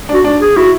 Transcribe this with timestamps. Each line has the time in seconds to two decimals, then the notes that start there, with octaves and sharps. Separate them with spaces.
0.09 D4
0.14 F#4
0.24 D4
0.40 G#4
0.56 E4 F#4